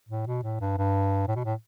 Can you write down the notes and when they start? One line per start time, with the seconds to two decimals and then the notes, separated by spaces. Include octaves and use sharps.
0.09 A2
0.27 B2
0.43 A2
0.61 G2
0.77 G2
1.28 A2
1.36 B2
1.44 A2